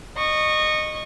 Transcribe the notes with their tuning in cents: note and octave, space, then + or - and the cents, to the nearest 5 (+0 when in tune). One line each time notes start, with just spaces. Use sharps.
D#5 -25 C#6 -10